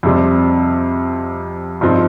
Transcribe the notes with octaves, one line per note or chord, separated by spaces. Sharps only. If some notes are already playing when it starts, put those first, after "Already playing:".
F2 C3 G3 C4
G2 F3 C4 D#4